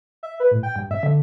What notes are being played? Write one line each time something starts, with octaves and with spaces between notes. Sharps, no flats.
E5
B4
A2
G5
G2
E5
D3